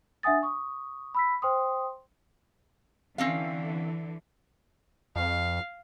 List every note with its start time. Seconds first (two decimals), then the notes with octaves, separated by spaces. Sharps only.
0.23 D4 E5 F#5 G#5 D#6 A6
0.43 C#6 D#6
1.14 B5 E6 B6
1.42 C5 G5 C6 D#6
3.18 D3 E3 C4 C#4 F5
5.16 F2 F5